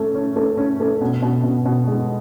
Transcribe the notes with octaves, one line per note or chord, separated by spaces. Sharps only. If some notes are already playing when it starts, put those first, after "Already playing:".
Already playing: A3 C#4
C#4
A3
C#4
A3
B2
B2
B2
B2
G#3